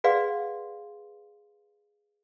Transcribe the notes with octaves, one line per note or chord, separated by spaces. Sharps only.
G#4 B4 D5 F5 F#5 C6